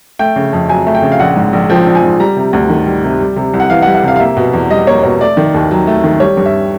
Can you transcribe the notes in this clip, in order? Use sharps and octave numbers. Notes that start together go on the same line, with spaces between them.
A3 G5
C#3
F2
F#3 G#5
A3
G5
C#3
F5
A#1 F#5
G#2
A#1
F3 G5
A#1
G#5
G#2
G3 A#5
C3
D2
D#3
G3
C3
G3
C3
C2
F#5
E3 F5
F#5
G3
F#5
C3 F5
F5
A#3 E5
B2
E2
G3 D#5
A#3 C#5
B2 C#5
A3 D5
D#3
D#2
F#3
A3
D#3
G3 C#5
G2
E5